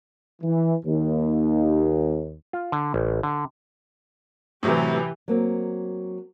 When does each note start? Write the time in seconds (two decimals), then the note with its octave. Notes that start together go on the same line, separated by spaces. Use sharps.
0.42 E3
0.85 D#2
2.53 F4
2.72 D3
2.94 A1
3.23 D3
4.63 A2 C3 E3 F#3 G4
5.28 F#3 A#3 C4